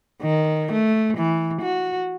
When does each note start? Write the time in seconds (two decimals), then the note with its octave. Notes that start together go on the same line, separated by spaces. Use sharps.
0.22 D#3
0.72 A3
1.17 E3
1.61 F#4